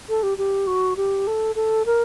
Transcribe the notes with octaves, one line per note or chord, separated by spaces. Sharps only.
A4
G4
G4
F#4
G4
A4
A4
A#4